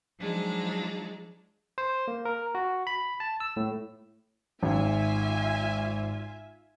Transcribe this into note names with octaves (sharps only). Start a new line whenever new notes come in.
F3 F#3 G#3 D4 D#4
C5
A#3
A#4
F#4
B5
A5
E6
A2
G#1 G#2 F4 E5 G#5